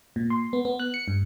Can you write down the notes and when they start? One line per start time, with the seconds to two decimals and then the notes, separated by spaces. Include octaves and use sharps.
0.16 A#2
0.30 C6
0.53 B3
0.65 B3
0.80 F#6
0.94 C#7
1.08 G2